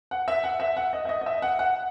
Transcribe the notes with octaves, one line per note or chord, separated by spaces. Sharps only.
F#5
E5
F#5
E5
F#5
D#5
E5
D#5
D#5
E5
F#5
F#5